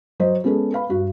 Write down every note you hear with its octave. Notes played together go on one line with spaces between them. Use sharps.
F#3 C5 D#5
G#3 B3 C#4 G#4 A4
B4 F5 B5
G2 F#4